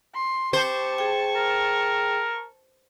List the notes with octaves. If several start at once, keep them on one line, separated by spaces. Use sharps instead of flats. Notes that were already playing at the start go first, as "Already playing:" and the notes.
C6
G4 C5 A5 C#6
G#4 G5
A#4